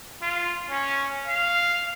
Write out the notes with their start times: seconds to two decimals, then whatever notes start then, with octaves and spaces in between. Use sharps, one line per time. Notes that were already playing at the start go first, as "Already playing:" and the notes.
0.22 F4
0.70 C#4
1.28 F5